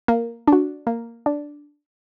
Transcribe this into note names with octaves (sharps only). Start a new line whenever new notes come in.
A#3
D4 F#4
A#3
D4